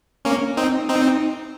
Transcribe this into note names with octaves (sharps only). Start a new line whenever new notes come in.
A#3 C#4
C4 D#4
C4 D#4